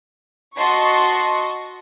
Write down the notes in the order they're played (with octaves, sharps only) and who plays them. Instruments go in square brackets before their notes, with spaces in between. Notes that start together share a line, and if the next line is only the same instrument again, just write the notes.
[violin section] F#4 D#5 A5 C6 C#6